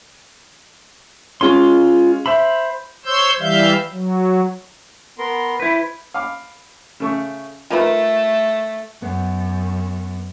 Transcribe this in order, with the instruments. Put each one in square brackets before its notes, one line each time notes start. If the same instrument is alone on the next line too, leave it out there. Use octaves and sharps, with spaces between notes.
[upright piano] G#3 C#4 [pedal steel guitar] F4 C6
[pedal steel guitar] C5 B5 [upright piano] E5
[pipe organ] C5 C#5 C6 E6 G6
E3 G3 E5 F5 G6
F#3
[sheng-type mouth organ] B3 A#4 C6
[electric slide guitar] E4 B4 [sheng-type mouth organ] C5
[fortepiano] F5 B5 D6
C#3 A3 C#6
[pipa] D#3 A#4 B4 [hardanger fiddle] A3 [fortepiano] F4
[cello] F#2 [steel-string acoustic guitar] B3